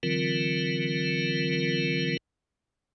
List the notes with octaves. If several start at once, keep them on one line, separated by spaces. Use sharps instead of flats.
D3 E3 F#3 C4 F4 A#4